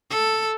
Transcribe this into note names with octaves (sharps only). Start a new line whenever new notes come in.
A4